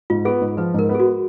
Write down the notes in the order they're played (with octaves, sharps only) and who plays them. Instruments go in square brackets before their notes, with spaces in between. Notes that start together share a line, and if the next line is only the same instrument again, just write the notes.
[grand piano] G#2 [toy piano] F4
[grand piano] B3 [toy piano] G#4
[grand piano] G#2
[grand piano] F3 [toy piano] B4
[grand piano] G#2 [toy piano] A#4
[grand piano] B3
[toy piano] G#4
F#4